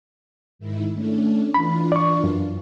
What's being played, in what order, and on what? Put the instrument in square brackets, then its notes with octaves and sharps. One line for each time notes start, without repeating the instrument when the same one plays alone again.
[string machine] G#2 D#3 E4
A3 C#4 D4
[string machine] E3 D4 F4 [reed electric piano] B5
[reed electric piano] D5 C#6
F#2